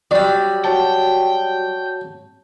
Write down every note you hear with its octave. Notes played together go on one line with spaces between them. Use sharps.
F#3 G3 D5 B5
F#4 C#5 G5 A5